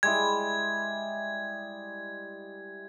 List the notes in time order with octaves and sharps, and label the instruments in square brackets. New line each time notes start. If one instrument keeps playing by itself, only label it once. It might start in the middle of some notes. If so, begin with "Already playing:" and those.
[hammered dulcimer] G3 G#3 E4 [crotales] G#6